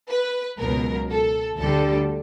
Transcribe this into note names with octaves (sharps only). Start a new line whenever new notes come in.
B4
C#2 B2 F#3 A#4
A4
D2 D3 G3 A4